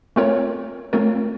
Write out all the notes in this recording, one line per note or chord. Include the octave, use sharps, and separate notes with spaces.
A3 C4 F4 A#4 C#5
A3 C4 F4 A#4 C#5